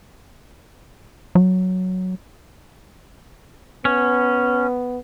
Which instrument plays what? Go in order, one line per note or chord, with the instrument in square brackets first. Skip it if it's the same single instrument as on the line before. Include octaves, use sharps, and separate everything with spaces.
[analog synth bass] F#3
[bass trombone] B3 [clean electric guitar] C#4